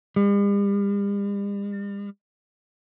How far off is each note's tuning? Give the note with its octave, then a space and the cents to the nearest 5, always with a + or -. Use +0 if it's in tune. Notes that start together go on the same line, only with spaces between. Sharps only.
G3 +45